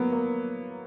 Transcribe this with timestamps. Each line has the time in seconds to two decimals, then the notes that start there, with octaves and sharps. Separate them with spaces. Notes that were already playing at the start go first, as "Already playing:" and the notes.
Already playing: F#3 A#3 B3
0.12 A#3